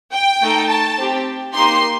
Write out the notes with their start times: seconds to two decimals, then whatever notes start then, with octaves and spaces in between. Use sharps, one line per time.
0.13 G5
0.41 A3 D#4 A4
0.69 A5
0.98 C4 G4
1.53 A#3 D#4 G4 C6